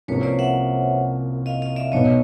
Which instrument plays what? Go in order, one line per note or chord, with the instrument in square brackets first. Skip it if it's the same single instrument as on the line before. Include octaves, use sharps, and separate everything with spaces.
[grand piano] C2 C3 F3 A#3 C#4 [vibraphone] B4 C#5
[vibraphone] C5 D5
E5 F#5
D#5 F5
D#5 F5
D5 E5
[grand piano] B1 B2 F#3 B3 [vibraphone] C#5 D#5